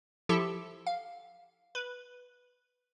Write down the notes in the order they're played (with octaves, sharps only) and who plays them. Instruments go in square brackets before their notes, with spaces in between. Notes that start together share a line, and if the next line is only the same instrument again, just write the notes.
[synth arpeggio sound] F3 E4 G4 A4 E5
F5
B4